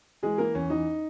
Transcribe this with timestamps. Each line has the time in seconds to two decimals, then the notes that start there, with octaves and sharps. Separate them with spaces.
0.23 E3 G#3 G#4
0.38 E3 A#3 A#4
0.55 E2 C#4
0.70 E2 D#4